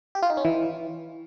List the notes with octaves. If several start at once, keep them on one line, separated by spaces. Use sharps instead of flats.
G4
F4
D#4
C#4
E3